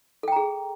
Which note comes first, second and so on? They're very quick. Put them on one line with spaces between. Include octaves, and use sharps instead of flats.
A4 G5 A#5 G#4